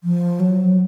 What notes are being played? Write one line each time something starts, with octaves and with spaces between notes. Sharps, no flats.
F3
F#3